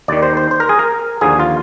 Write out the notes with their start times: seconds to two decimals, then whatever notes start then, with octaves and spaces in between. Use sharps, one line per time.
0.08 D#2 D#3 D5
0.23 C5
0.37 C5
0.51 C5
0.60 A#4
0.69 G#4
0.79 A#4
1.21 D#2 D3 F3 G#4
1.40 F4